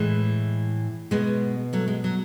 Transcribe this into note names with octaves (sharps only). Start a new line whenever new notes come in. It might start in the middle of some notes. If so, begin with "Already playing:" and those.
Already playing: A2 E3 G#3
B2 G#3 B3
F#3 A3
G#3
F#3